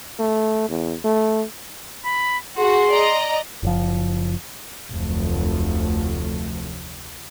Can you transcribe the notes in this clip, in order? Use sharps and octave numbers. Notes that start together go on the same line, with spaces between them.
A3
E2
A3
B5
F#4 G#4 C6
D5 D#5 A#5
F#1 F3
F1 D2 F3 F#3 A3